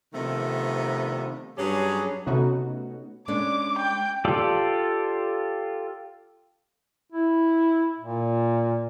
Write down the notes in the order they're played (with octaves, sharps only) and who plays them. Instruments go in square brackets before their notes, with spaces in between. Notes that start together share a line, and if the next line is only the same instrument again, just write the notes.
[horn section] C3 D#3 F3 A3 B3 D4
G2 F#3 C#4 G4 G#4
[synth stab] C3 A3 B3 C#4 D#4 F#4
[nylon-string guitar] G#3 C#4 D4 [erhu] D6
[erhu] G5
[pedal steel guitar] F4 G4 A4 D5
[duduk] E4
A#2